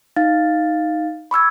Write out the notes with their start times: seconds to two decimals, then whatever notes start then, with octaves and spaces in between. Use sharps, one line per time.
0.16 D#4 F5 A6
1.31 B5 C#6 E6 G#6